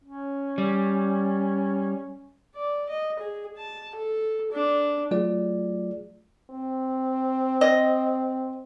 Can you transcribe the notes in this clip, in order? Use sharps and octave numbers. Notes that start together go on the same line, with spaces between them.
C#4
G3
D5
D#5
G#4
A5
A4
D4
F#3 A3 F4 G#4 D5
C4
D#5